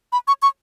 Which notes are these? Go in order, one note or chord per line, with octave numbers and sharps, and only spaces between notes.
B5
C#6
C#6